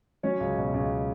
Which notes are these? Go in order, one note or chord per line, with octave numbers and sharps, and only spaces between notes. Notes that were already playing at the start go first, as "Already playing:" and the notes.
F#3 C#4 C#5
C#2
B2
C#2